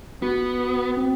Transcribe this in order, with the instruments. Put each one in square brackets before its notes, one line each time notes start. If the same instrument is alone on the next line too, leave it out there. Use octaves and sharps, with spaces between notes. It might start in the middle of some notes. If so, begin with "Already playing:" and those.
[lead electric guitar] B3 [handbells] F#4
[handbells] F#4
C4